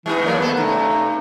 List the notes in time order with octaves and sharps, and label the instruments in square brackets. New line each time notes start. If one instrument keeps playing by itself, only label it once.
[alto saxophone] E3 [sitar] G3 B3 D#4
[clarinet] F#3 [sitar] G3 C#5 D5 [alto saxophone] A#3
[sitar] E2 G3 A4 [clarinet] B3 [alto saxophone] B4
[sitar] G2 C3 [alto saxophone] A3 [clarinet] D#4